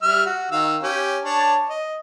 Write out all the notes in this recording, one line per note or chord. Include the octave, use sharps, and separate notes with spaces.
G3 E5 F6
F#4
D#3 F5 E6
C#4 G4
D4 C#5 A5
D#5